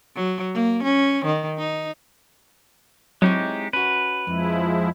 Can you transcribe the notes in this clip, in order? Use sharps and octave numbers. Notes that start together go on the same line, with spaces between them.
F#3
A#3
C#4
D#3
D#4
F#3 G#3 C4 D#4 E4 G4 C#5
C#4 F#4 B4
F2 F3 G#3 E4